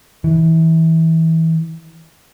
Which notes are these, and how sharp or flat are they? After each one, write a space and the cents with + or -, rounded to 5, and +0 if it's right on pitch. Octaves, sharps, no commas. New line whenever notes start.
E3 -25